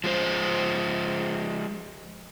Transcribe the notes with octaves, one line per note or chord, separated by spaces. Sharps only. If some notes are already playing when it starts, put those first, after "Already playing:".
F3 G#3 C5